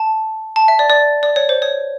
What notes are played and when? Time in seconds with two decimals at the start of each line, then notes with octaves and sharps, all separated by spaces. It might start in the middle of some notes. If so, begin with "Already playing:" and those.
Already playing: A5
0.56 A5
0.68 E5
0.79 D5
0.90 D5
1.23 D5
1.36 C#5
1.49 C5
1.62 C#5